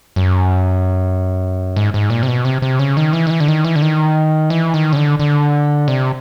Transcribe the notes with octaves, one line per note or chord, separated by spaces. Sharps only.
F#2
G#2
G#2
A#2
C3
B2
C3
C3
C#3
D#3
E3
D#3
E3
D3
D#3
E3
D3
D#3
E3
D#3
C#3
D3
D3
C3